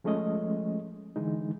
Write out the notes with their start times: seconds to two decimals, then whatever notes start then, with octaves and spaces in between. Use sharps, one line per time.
0.04 F3 G#3 A3 C#4 D#5
1.16 D3 E3 G#3 D#4